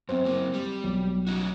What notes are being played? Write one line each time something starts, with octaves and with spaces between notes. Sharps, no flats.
F#2 C4 C5
F#2 A#3
G3
B1
C#4 D#4 F#4